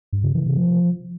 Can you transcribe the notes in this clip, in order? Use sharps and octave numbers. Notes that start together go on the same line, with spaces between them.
G2
C#3
E3
C3
F3